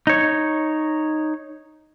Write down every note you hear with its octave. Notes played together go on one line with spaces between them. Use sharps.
D#4 C#5